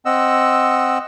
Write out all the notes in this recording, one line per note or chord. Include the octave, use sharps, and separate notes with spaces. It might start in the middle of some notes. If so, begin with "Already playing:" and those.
C4 D#5 F#5 E6